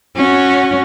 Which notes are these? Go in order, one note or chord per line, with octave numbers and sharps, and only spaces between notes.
C#4 F#4